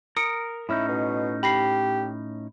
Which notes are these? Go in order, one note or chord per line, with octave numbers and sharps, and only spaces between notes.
A#4 D#6 C#7 D7
A2 C#4 D#4 E4
B2
G4 B5 A#6 C7